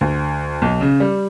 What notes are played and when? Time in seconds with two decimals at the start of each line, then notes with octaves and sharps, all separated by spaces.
0.01 D2
0.62 B1
0.81 C#3
1.00 G3